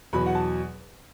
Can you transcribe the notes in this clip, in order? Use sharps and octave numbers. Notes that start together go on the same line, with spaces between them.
E2 B2 F#3 B5
F#5
A5